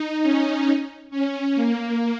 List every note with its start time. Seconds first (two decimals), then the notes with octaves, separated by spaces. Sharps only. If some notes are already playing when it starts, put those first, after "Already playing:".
Already playing: D#4
0.23 C#4
1.11 C#4
1.56 A#3